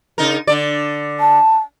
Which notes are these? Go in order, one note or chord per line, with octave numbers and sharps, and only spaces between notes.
C#3 D#4 A#4
D3 D5
A5